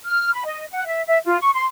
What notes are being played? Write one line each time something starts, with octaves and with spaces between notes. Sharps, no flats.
F6
B5
D#5
F#5
E5
E5
F4
C#6
C6